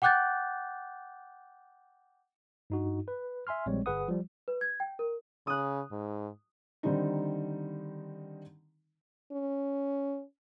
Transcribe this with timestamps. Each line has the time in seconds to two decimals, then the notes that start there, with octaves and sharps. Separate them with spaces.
0.02 F#5 G5 D6 F#6 G6 A6
2.70 G2 D#4 F#4
3.08 B4
3.47 E5 G#5 C6 F6
3.66 A#1 G3 G#3 C4 C#5
3.86 G1 G#4 B4 F#5 D#6
4.08 F3 G3
4.48 B4
4.61 G#6
4.80 G5
4.99 A#4
5.47 C#3 D#6 F#6
5.92 G#2
6.83 D3 D#3 G3 C4 D4 D#4
9.32 C#4